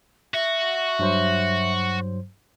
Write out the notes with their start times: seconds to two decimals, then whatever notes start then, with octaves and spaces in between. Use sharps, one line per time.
0.34 F#4 E5
0.99 G2 F#3 C5